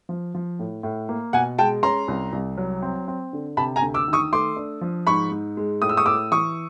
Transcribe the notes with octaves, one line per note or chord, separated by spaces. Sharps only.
F3
F3
A2
A2
A#3
B2 F#5 G#5
G#3 G5 A5
C#4 A#5 C6
C2
C2
F#3
C4
C4
D3
C3 A5 B5
G#5 A#5
D2
D6 E6
D#3
C#6 D#6
A3 C6 D6
D4
F3
G#2 B5 C#6
G#2
G#3
A2 D#6
E6
C#6 D#6
A2 D6 E6
E3 C#6 D#6